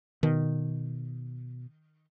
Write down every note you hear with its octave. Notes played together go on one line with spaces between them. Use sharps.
B2 D#3